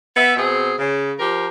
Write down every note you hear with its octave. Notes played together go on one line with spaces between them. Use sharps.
B3 E5
B2 C4 G#4
C#3
F3 G4 A#4